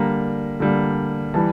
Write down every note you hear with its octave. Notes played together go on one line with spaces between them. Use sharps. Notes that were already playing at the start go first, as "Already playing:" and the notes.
Already playing: D3 G3 A#3 A#5
D3 G3 A#3
E3 G3 A5